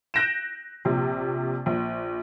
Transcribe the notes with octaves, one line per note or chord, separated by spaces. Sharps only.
F#6 G6 A#6 D7 E7
A#1 C3
A#1